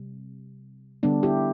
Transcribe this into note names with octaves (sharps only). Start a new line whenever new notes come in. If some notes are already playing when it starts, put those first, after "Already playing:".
Already playing: C3 G3
D3 G3 B3 D4
E4 G4